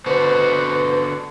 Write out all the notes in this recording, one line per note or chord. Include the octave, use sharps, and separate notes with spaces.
D3 B3 F#4 B4 C5